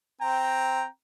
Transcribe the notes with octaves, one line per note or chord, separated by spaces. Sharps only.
C4 G5 A#5